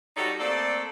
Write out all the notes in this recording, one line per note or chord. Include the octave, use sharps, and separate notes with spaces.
G3 D#4 F#4 A4 C#5 D5
A3 A#3 C4 A4 D5